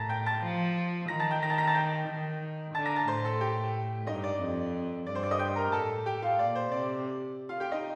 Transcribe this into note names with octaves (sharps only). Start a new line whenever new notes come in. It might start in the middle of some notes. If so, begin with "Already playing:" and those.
Already playing: A2 A5 A#5 A6 A#6
G5 G6
A5 A6
F3
D#3 A#5 A#6
A5 A6
G5 G6
A#5 A#6
A5 A6
A#5 A#6
A5 A6
G5 G6
D#3
D3 A5 A6
A#5 A#6
A5 A6
A2 C5 C6
A4 A5
G4 G5
G2 D#4 D#5
D5
F2
G2 D5
C5 C6
D5 D6
D#5 D#6
G5 G6
A#4 A#5
A2 A4 A5
G4 G5
F4 F5
A#2 D5
C5
C3 D5
F4 F5
G4 G5
D#4 D#5